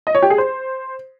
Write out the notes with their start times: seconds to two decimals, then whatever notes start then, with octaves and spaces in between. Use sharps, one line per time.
0.07 D#5
0.15 C#5
0.22 G4
0.30 G#4
0.38 C5